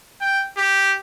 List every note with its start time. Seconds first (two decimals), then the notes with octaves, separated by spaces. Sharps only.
0.22 G5
0.57 G4